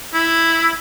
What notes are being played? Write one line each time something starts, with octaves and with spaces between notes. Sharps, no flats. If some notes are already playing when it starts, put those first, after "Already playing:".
E4